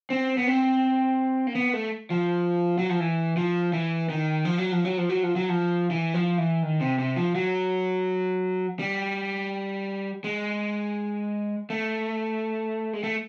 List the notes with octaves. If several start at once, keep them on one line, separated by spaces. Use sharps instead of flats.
C4
B3
C4
A#3
B3
A3
F3
F#3
F3
E3
F3
E3
D#3
F3
F#3
F3
F#3
F3
F#3
F3
F#3
F3
E3
F3
E3
D#3
C3
C3
F3
F#3
G3
G#3
A3
G#3
A3